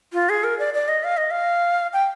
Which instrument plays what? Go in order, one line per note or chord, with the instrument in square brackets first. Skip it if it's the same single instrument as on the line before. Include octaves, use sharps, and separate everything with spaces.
[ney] F4
G#4
A#4
D5
D5
D#5
F5
D#5
F5
G5